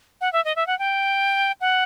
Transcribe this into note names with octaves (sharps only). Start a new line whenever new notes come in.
F#5
E5
D#5
E5
F#5
G5
F#5